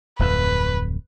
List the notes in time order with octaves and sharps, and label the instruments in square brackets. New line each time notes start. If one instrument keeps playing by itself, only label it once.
[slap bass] D1 F2 [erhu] B4